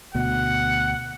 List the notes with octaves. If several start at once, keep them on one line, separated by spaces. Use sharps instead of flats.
D2 B2 F#5